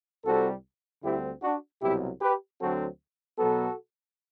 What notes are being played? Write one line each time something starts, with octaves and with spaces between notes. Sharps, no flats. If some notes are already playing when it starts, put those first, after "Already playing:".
C2 C3 G3 C4 F#4 A4
D2 D3 G3 C4 E4 G4
D4 F#4
C2 B2 F#3 E4 G4
G4 B4
D2 D3 F#3 C4 F#4 A4
B2 F#3 B3 F#4 A4